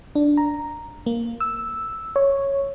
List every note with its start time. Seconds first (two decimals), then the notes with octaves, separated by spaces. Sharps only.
0.15 D4
0.37 A#5
1.06 A#3
1.40 E6
2.16 C#5